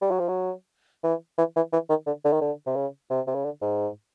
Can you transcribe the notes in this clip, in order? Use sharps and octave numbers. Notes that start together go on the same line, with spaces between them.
G3
F#3
F3
F#3
E3
E3
E3
E3
D#3
D3
D3
D#3
D3
C3
C#3
C3
C3
C#3
D3
G#2